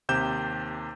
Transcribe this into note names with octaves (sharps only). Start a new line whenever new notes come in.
D#2 C3 G4 G6 E7